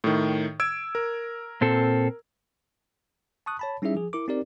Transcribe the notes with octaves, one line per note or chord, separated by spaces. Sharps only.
A2 D#3
E6 G#6 D7
A#4
A#2 C4 A4
A5 C#6 D#6 F#6
C#5 A5 B5
G3 C#4 D#4 E4 G#4 E5
F3 G#4
E4 A#4 D6
C4 D#4 G4 A#4 D5